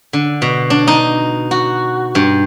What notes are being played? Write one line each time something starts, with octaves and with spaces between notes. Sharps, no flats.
D3
B2
D4
D#4
F#4
G2